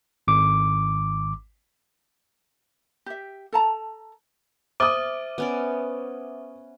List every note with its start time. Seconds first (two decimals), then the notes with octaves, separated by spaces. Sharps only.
0.28 G#1 D6
3.06 G4 E5
3.53 A4 A5 A#5
4.80 C5 E5 D6 D#6
5.38 B3 C#4 D5